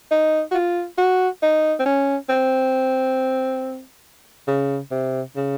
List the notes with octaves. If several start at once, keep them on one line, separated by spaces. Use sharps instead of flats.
D#4
F#4
F4
F#4
D#4
C4
C#4
C4
C#3
C3
C#3